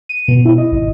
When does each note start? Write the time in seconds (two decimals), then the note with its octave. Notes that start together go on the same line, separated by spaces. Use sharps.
0.09 D#7
0.28 B2
0.45 E4
0.58 D#5
0.72 G#1